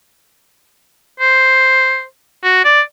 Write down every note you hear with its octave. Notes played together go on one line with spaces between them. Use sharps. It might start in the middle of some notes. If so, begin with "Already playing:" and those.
C5
F#4
D5